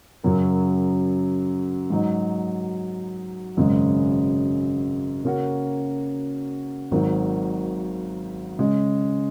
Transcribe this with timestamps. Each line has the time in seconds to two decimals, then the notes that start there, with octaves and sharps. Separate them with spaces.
0.24 F#2 C#3 F#3 C#4 A#4
1.90 G#2 F#3 D#4
3.57 G#1 F#2 C#3 G#3
5.24 C#3 A#3 C#4 F#4 A#4
6.91 G#1 G#2 D#3 F#3
8.59 C#3 G#3 C#4